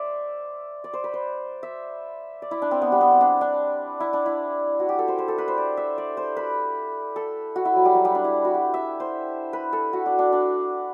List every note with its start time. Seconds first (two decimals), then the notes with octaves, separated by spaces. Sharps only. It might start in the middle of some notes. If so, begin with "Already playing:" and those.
Already playing: C5 D5 E5
0.84 D5
0.93 C5
1.04 B4
1.14 C5
1.63 E5
2.42 D5
2.51 E4
2.62 D4
2.71 C4
2.81 B3
2.92 G3
3.01 B3
3.11 C4
3.21 D4
3.41 D4
4.00 E4
4.13 D4
4.26 E4
4.80 F#4
4.89 G4
4.99 A4
5.08 C5
5.18 C5
5.28 A4
5.38 B4
5.48 C5
5.58 D5
5.77 E5
5.98 D5
6.17 C5
6.36 B4
7.16 A4
7.56 F#4
7.65 E4
7.76 F#3
7.85 G3
7.95 F#3
8.05 G3
8.15 D4
8.24 E4
8.45 F#4
8.54 G4
8.74 E5
9.00 C5
9.53 B4
9.73 A4
9.93 F#4
10.06 D4
10.19 D4
10.32 D4